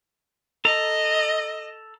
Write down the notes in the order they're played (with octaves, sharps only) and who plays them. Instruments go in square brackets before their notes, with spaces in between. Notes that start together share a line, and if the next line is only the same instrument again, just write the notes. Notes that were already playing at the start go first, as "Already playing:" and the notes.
[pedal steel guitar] A4 A#5 [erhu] D#5